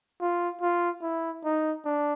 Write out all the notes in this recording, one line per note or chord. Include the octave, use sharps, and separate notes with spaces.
F4
F4
E4
D#4
D4